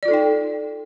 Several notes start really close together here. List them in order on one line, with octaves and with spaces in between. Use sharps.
D5 F4 A4 D#4 G5